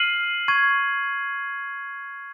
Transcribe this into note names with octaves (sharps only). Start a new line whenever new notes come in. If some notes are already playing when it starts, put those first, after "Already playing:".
Already playing: F6 C7 D#7 F#7
C#6 G#6 D#7